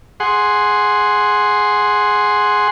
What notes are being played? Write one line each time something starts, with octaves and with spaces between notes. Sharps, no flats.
G#4 F#5 C6